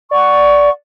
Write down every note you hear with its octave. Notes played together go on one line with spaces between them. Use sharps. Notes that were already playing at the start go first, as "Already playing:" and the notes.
D5 F#5 C#6